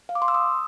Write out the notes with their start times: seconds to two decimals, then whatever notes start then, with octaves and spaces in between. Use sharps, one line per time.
0.09 F5
0.15 D6
0.22 C6
0.28 E6
0.34 D#6